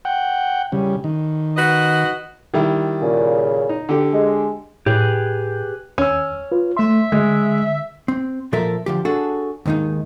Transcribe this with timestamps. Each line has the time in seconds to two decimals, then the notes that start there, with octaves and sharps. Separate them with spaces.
0.05 F#5 G5
0.72 C#3 G3
1.04 D#3
1.57 F#4 B4 D#5
2.54 D#3 G3 E4
3.01 A#2 C#3
3.69 D#4
3.89 D3 G4
4.13 G#3
4.86 A2 G4 G#4 B4
5.98 D#2 C#4 E6
6.52 F4 B4
6.77 A3 E5 C6
7.12 D3 G#3
8.08 C4
8.53 A#2 F3 A4 A#4 E5
8.86 D3 F3 G4
9.05 D4 F#4 G#4 A4
9.66 D#2 G#2 D#3 G#3 D#4